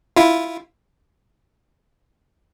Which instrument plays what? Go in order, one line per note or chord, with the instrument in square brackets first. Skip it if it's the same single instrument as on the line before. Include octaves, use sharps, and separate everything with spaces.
[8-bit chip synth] E4 F4